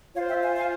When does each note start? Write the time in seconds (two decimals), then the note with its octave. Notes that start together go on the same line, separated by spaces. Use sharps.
0.14 F4 C5 C#5 F5
0.29 E5 G5
0.43 F5 G#5
0.57 F5 G#5